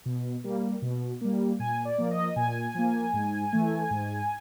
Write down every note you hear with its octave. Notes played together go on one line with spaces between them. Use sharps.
B2
G3 A#3
B2
G3 A#3
A#2 G#5
D5
F3 A#3
D#5
A#2 G#5
F3 A#3
G#2
E3 A3
G#2